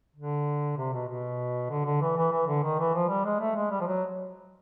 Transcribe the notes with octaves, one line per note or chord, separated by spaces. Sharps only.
D3
C3
B2
B2
D3
D3
E3
E3
E3
D3
D#3
E3
F3
G3
G#3
A3
G#3
G3
F3
F#3